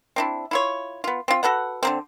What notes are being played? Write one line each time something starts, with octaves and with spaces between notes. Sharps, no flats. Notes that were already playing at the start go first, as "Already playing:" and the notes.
C4 D4 E4
E4 F4 C#5
B3 F4
C4 F4
F#4 A4 B4 F#5
D3 A#3 C4